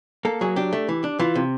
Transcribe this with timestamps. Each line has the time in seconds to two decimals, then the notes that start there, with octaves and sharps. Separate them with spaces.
0.25 A#3 A4
0.41 F#3 G#4
0.56 D4 G4
0.73 A3
0.89 E3
1.04 D4
1.19 E3 F4
1.35 C3